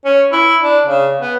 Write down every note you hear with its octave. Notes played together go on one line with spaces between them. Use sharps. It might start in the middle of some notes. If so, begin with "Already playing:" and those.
C#4
E4
D4
C#3
B3